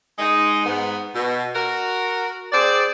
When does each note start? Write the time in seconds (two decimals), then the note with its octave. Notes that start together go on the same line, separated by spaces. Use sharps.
0.19 G#3 D#4 D#5
0.66 G#2 B3
1.15 B2
1.54 F#4 A#4
2.52 C4 G#4 C5 D5